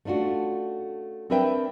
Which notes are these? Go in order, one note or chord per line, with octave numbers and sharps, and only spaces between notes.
A3 C#4 D4 F4 F#4
C4 D4 A#4 B4 E5 G5